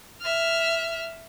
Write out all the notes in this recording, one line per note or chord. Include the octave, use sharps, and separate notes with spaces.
E5 F6